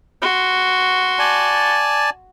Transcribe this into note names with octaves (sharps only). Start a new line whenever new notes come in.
F#4 C6
D5 G#5 A5